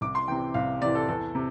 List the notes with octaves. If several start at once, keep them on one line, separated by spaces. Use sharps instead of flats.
C2 D6
C6
C3 E3 G5
C2 F5
C3 E3 D5
A4
E2 A4
C3